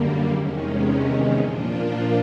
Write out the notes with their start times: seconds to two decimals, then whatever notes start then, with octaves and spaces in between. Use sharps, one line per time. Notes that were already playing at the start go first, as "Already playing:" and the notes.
Already playing: F#2 D3 G3 A#3
0.30 E2 C3 D#3 G#3 C#4
1.38 A#2 F3 A#3 D4 F4